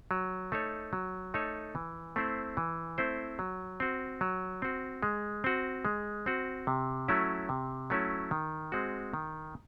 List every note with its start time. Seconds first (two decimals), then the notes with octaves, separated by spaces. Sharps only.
0.11 F#3
0.52 A3 D#4 A4 C#5
0.93 F#3
1.34 A3 D#4 A4 C#5
1.75 E3
2.16 A3 C4 E4 C5
2.57 E3
2.98 A3 C4 E4 C5
3.39 F#3
3.80 C4 F#4
4.21 F#3
4.62 C4 F#4
5.03 G#3
5.44 C4 F#4
5.85 G#3
6.26 C4 F#4
6.67 C3
7.08 F#3 A3 C#4 E4
7.49 C3
7.90 F#3 A3 C#4 E4
8.31 D#3
8.72 G#3 C4 F#4
9.14 D#3